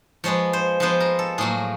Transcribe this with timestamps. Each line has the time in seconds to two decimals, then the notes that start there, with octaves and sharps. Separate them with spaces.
0.24 F3 G#3 B3 C#5
0.53 C5
0.80 F3 G#3 B3 C5
1.00 A#4
1.19 A4
1.38 A2 F#3 A#3 G#4